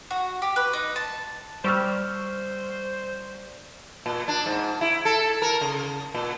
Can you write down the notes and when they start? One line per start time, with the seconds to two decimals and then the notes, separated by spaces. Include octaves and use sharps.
0.11 F#4
0.42 G4
0.56 B4
0.73 D#4
0.96 A5
1.64 G3 C5 C#6 E6 F6
4.06 A#2
4.28 D4
4.46 G#2
4.81 E4
5.05 A4
5.42 A#4
5.61 C#3
6.15 A#2